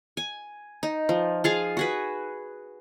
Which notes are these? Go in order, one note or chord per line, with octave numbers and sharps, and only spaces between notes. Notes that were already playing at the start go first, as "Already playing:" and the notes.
G#5
D#4
F3
F4 G#4 F5
F#4 G#4 B4